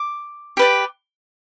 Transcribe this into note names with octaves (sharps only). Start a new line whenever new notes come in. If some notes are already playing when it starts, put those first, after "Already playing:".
Already playing: D6
G4 B4 D5